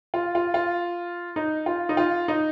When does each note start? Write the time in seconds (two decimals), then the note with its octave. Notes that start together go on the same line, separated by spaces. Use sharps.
0.14 F4
0.35 F4
0.54 F4
1.36 D#4
1.66 F4
1.89 D#4
1.97 F4
2.28 D#4